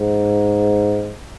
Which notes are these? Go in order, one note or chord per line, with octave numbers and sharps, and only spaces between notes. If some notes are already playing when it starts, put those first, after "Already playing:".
Already playing: G#2